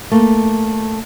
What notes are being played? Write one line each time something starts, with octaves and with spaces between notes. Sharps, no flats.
A3 A#3